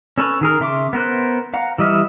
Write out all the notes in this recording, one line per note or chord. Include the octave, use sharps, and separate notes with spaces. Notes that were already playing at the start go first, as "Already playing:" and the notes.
C#4 A4 B4 C#5
D#3 G#4 A#4
C#3 E5 C6 D6
B3 A#4 C5 F#6
F5 F#5 A#5
E3 G3 D#5 E5 F6